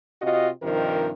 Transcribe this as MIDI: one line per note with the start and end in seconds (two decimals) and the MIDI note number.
0.21 0.49 48
0.21 0.49 65
0.21 0.49 66
0.21 0.49 75
0.62 1.11 43
0.62 1.11 48
0.62 1.11 51
0.62 1.11 53
0.62 1.11 63
0.62 1.11 70